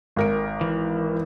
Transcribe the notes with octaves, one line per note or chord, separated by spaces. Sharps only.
G#1 A#4 D7
E3